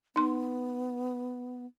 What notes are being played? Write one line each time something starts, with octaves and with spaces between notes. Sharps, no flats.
B3 D#4 C6